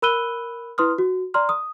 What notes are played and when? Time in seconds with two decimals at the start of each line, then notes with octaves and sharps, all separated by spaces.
0.02 A#4 B5 E6 F#6 D#7 G7
0.78 E4 B4 C6 D#6 F6
0.98 F#4
1.34 D5 A#5 C6 F6
1.49 D#6